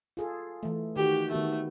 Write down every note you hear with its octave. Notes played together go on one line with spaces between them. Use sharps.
F4 G#4 A4
E3 A3
D#3 F#4 G4
D#3 A3 B3 F#4